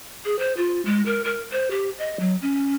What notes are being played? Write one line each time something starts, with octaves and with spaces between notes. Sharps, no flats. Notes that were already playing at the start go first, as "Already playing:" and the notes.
G#4
C5
F4
G#3
A#4
A#4
C5
G4
D#5
F#3
C#4